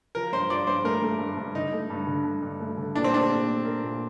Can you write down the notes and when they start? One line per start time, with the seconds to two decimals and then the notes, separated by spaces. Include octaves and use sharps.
0.15 F3 A#4
0.33 G2 C5
0.50 F3 D5
0.67 G2 C5
0.84 A3 A#4
1.02 A3
1.19 G2
1.37 G2
1.55 D3 D#4
1.73 A3
1.90 G2
2.07 D3
2.25 G2
2.43 G2
2.60 A3
2.77 D3
2.95 A#2 D4
3.04 C4
3.12 A3 D4
3.30 A#2
3.48 A3
3.65 A#4
3.82 A#2